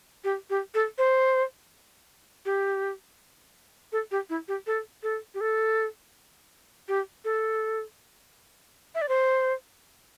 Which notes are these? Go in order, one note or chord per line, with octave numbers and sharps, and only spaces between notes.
G4
G4
A4
C5
G4
A4
G4
E4
G4
A4
A4
G4
A4
G4
A4
E5
D5
C5